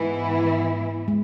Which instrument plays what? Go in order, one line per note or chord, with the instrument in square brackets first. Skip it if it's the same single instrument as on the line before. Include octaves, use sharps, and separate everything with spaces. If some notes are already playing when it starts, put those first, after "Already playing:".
Already playing: [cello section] G#2 E3 B3 E4
[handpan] G#3